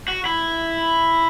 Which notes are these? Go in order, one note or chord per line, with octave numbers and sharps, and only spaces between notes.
F#4
E4